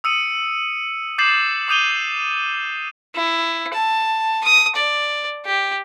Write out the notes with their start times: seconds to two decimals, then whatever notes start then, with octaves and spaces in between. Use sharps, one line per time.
0.04 D#6 E6 C#7 D#7
1.18 D6 G6 A6 C7 E7 F#7
1.68 D6 D#6 G6 D#7 F7 G7
3.15 E4
3.73 A5
4.44 D#6
4.75 D5
5.45 G4